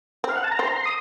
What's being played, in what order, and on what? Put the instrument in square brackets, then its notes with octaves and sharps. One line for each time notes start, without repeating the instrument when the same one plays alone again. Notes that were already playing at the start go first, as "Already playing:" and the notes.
[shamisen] C4
[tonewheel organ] F5
F#5
A5
A#5
[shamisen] C4 [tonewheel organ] C6
[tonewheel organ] A#5
C6
D#6